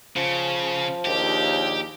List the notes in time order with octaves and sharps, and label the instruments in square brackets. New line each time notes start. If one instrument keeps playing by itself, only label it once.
[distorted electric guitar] C#3 [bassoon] F3
[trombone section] A#1 D#2 [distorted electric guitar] G4